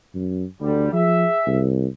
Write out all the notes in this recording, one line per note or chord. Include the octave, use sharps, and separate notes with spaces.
F#2
D2 D3 G3
F3 G#4 E5
C2